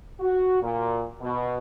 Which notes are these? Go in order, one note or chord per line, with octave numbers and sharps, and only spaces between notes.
F#4
A#2
B2